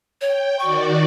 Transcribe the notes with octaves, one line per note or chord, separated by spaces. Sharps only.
C#5 G5
D#3 F#4 D5 C#6